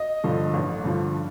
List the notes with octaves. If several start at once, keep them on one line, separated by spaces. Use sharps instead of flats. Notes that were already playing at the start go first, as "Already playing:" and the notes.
Already playing: D#5
G2 D3 F3
A1
G2 D3 F3